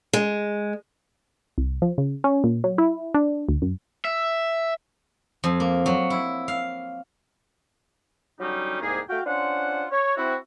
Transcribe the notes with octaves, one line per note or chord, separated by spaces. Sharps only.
G#3
C2
F3
C#3
C#4
A#2
F#3
E4
D4
D2
F#2
E5
F2
A#3
F#3
E4
F5
D3 F#3 G3 C#4 D#4 G4
C2 G#2 A#3 G4 G#4
A3 F#4 F5 G5
C#4 D4 F4 C5 F#5
C#5
C4 E4 F#4